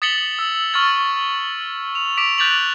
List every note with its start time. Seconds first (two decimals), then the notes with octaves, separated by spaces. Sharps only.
0.02 D#6 A6 B6 C#7 F#7 G7
0.39 E6
0.73 C#6 F6 A6 F#7
1.95 F7
2.17 D6 B6 D7 F7
2.38 F#6 G6 A6 B6 F7 F#7